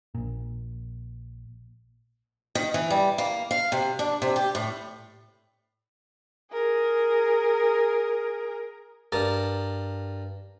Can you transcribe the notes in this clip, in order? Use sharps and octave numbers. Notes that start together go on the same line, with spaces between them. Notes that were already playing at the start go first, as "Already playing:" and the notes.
A#1 A#2
D#3
E3
G3
A#3
F5
C3
D4
C3
G4
A2
G#4 A#4
G2 A#4 A5